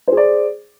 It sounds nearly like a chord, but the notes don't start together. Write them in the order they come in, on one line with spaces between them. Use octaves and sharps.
C5 G#4 D5